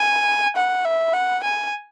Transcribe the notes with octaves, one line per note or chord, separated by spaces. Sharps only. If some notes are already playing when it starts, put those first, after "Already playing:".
Already playing: G#5
F#5
E5
F#5
G#5